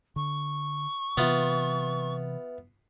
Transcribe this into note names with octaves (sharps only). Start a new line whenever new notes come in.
D3 C#6
C3 E3 B3 F4 B4 E5